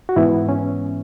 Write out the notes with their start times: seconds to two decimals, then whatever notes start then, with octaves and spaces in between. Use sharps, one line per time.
0.09 F#4
0.16 G#2 E3 B3 E4
0.49 C#4